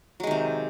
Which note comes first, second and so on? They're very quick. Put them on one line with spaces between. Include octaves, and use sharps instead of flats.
F#3 G#3 D#3 C3